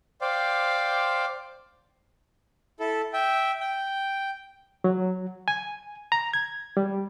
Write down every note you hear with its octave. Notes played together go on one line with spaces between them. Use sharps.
C5 D5 F5 G5
E4 A4
E5 G5
G5
F#3
G#5
A#5
G#6
G3